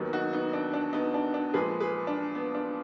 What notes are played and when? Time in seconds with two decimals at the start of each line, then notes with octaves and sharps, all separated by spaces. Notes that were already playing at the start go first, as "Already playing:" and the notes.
Already playing: D#2 D#3 F#3 B3
0.13 D#4 F#4
0.33 B3 D#4
0.53 D4
0.74 D4
0.93 B3 D#4
1.14 D4
1.34 D4
1.54 A#2 F3 G#3 G#4 B4
1.80 G#4 B4
2.07 D4
2.35 B3
2.55 D4